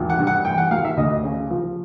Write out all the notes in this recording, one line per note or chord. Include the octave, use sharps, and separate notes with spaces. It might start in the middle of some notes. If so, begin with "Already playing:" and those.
Already playing: G#1 E2
F#5
G2
F#5
E3 G5
F#5
G#1 F5
E5
D2 D#5
C#3
F3